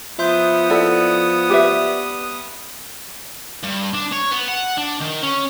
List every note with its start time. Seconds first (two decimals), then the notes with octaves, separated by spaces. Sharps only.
0.19 F3 B3 E5 C6 D#6 G6
0.70 E4 A4 D5 F#5 B5
1.50 G4 B4 E5
3.63 G2
3.93 D4
4.12 C#5
4.31 B3
4.48 F#5
4.77 D4
5.00 D#3
5.22 C#4